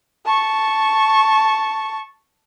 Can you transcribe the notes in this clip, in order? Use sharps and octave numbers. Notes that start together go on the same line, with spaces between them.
A5 C#6